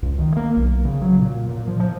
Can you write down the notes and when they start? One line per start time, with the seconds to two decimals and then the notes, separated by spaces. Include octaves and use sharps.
0.02 C#2
0.18 D#3
0.37 A#3
0.57 B1
0.85 C#3
1.02 F#3
1.19 A#2
1.49 A#2
1.68 F3
1.80 F3